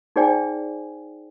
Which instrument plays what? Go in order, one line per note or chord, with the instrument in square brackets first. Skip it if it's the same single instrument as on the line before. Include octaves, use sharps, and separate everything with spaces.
[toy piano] D#4 G#4 C5 D5 G5 G#5